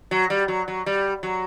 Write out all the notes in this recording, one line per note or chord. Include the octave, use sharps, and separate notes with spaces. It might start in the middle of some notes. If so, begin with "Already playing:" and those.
F#3
G3
F#3
F#3
G3
F#3